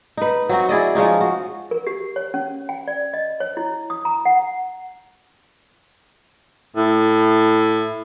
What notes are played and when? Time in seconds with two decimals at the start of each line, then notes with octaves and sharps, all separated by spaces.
0.17 D#4 B4
0.49 F#3 C4 F#4
0.69 E4 G#4 D5 D#5
0.95 F3 G#3 C#4 D#4
1.21 F#4
1.71 A#4
1.87 G4
2.16 C#5
2.34 C#4
2.69 G5
2.88 D5
3.14 D#5
3.40 C#5
3.57 E4
3.90 D#6
4.05 A#5
4.25 F#5
6.76 A2